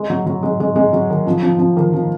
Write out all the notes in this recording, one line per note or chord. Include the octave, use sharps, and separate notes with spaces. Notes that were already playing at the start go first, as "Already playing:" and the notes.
Already playing: G#3
F#3
F#3
G#3
G#3
G#3
F#3
D#3
F3
F3
F3
D#3
F3